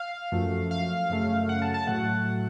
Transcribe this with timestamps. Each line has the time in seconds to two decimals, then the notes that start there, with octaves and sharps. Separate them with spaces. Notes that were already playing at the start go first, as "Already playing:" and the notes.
Already playing: F5
0.32 F#2 F3 A3
0.71 F5
1.10 F#2 C#3 A3
1.49 F#5
1.62 A5
1.74 A5
1.87 A2 F#3 A3 F#5